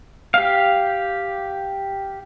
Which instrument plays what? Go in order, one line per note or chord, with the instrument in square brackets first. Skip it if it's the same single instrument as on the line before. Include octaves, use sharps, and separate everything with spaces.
[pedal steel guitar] G4 F5